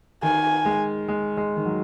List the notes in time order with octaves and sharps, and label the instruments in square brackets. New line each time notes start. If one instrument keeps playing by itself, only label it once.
[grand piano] D#3 [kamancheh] G#5
[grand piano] G#3
G#3
G#3
D#3
F#3